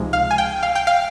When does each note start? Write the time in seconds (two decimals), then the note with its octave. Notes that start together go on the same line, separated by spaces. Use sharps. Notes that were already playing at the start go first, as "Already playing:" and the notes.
Already playing: C#2 C3 F3 G#3 D#4
0.13 F5
0.31 G#5
0.38 G5
0.63 F5
0.75 G5
0.87 F5